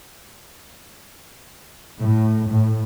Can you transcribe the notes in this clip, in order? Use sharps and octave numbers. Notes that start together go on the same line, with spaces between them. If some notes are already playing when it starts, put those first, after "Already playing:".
A2
A2